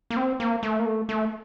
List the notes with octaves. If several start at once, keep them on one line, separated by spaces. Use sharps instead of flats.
A#3
C4
A#3
A3
A#3
A3
A3